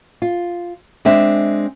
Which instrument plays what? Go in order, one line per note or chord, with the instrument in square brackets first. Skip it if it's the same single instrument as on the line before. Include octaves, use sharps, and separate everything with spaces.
[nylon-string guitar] F4
G#3 C4 D4 E5